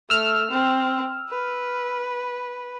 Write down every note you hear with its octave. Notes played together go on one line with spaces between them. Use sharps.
A3 E6 F6
C4
B4